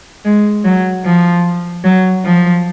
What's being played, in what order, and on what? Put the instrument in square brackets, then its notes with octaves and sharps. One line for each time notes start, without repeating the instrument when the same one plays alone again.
[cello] G#3
F#3
F3
F#3
F3